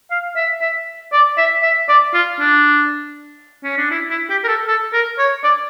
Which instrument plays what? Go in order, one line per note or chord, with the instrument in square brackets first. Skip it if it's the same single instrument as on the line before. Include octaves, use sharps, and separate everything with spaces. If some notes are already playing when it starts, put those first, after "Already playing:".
[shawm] F5
E5
E5
D5
E5
E5
D5
F4
D4
C#4
D4
E4
E4
G4
A#4
A4
A4
A#4
C#5
D5